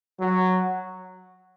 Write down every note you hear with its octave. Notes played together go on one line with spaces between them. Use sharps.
F#3